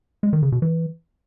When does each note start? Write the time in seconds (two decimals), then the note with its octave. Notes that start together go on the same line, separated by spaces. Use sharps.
0.23 G#3
0.33 D#3
0.43 C#3
0.52 B2
0.62 E3